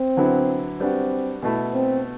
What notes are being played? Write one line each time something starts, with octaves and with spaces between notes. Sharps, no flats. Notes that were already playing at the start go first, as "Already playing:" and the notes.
Already playing: C4
D3 F#3 B3 E4
G3 B3 C4 D4 F#4
B2 A3 E4
C4